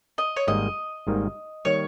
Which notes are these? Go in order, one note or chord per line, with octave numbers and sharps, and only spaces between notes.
D#5
C#5
G#1 G#2 D#3 G3 A#3 D#5
G#1 G#2 D#3 G3 A#3
D#3 G3 A#3 C#5